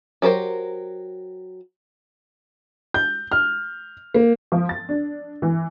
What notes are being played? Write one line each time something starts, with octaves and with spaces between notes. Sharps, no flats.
F#3 G4 A#4 C5
G6
F6
A#3
F3
A6
D4
E3